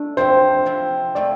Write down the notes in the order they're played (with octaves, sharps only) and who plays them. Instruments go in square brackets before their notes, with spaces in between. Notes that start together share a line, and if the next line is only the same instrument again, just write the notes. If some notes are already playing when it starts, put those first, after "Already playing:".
Already playing: [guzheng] A3 D4
[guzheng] F3 C4 E4 G4 [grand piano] C5
[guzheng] C3 F3 C4 E4
[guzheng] F3 A3 C4 E4 [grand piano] D5